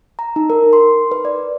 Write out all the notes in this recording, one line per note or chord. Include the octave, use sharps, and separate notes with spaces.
A#5
D#4
A#4
C6
B4
D5